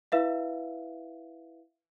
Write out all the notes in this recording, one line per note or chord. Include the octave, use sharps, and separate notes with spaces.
E4 B4 E5 F5